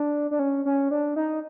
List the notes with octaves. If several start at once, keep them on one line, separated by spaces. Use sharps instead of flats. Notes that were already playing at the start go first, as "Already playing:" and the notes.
Already playing: D4
D4
C#4
C#4
D4
D#4